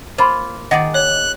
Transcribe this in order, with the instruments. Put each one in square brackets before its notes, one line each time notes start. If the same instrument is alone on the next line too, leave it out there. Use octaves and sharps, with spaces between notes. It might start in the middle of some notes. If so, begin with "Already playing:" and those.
[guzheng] A#3 F4 [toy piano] C5 B5 C6
[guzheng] D#3 G#4 D5 [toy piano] D#5 [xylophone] F#5 A#6
[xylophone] C#5 [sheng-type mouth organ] F#6